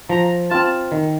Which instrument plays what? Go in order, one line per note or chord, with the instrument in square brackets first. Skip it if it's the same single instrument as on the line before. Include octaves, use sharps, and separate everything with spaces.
[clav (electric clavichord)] F3 [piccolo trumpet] A#5
[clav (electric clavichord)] C4 F4 [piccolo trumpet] A5
[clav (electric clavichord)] D#3